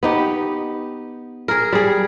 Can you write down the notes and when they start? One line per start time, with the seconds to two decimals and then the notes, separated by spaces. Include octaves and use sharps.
0.03 B3 D#4 G4
1.48 G#4 A#4
1.72 G3 G#4